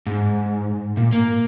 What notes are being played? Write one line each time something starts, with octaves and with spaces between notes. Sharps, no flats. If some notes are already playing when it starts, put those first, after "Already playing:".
G#2
A#2
A#3